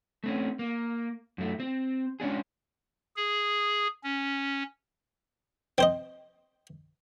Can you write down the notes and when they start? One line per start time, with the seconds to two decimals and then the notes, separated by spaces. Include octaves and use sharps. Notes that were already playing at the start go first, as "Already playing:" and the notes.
0.24 A3 C4 C#4
0.59 A#3
1.38 F#2 A3
1.60 C4
2.20 G#3 C#4 D4 G#4
3.16 G#4
4.04 C#4
5.78 C4 C5 D#5